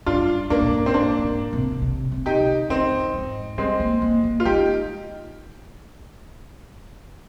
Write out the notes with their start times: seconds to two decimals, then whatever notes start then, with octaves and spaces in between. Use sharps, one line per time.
0.06 G2 D4 F4
0.50 G#2 A#3 D4
0.62 A#2
0.73 G#2
0.86 C4
0.94 A#3 D4
1.19 G2
1.24 G#2
1.53 C3
1.71 D3
1.82 C3
2.11 C3
2.26 D#4 G4
2.41 D3
2.70 D#3 C4 D#4
2.92 F2
3.14 G#2
3.58 G3 G#3 C4
3.80 A#3
4.02 A#3
4.24 A#3
4.40 F4
4.45 G#3 D#4 G4